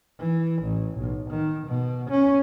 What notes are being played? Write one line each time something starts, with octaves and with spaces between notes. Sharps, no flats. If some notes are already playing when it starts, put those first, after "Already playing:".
E3
A1
B1
D#3
B2
C#4